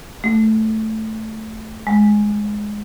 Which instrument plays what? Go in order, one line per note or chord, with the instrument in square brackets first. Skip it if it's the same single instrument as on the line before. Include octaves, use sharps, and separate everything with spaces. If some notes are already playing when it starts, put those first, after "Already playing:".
[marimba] A3
G#3